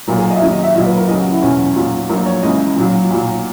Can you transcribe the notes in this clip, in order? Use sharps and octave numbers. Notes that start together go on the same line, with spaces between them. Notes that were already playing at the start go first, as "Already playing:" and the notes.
B1 A#2 F#3 A#4
G#4
D#5
E5
D#2 D#3 F#3 D#5
D#5
E5
B1 A#2 F#3 D#5
B4
A#4
D#2 C#3 F#3 D#5
F#4
E4
E2 B2 F#3 C#4
B1 A#2 F#3
A#1 A#2 F#3 A#4
C#5
C#2 C#3 E3 D#5
B1 A#2 F#3
B1 A#2 F#3